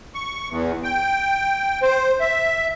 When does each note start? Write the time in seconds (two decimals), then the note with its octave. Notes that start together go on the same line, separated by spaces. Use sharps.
0.15 C#6
0.50 E2
0.84 G5
1.82 C5
2.20 E5